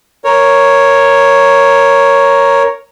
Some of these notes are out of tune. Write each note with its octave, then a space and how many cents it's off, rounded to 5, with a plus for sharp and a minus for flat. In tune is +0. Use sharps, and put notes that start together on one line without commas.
A#4 +0 C#5 +0